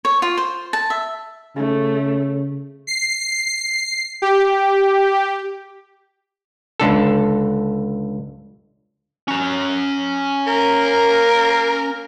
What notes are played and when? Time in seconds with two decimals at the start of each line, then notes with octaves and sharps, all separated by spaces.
0.05 C#5
0.22 F4
0.37 C5
0.73 A5
0.90 E5
1.56 C#3 A3
2.87 C7
4.22 G4
6.80 C#2 D3 A4
9.28 C#4 A#5
10.47 A#3 A#4